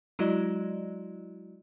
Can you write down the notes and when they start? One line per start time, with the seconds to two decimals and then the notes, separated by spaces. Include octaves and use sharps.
0.19 F#3 G#3 E4 F#4 D5 D#5